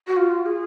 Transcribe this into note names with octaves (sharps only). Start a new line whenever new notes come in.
F#4
F4
G#4